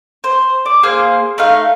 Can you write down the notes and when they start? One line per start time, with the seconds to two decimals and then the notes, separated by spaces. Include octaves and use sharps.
0.24 C5
0.66 D5
0.83 A#3 G#4 C5 F6
1.38 A3 D#4 F5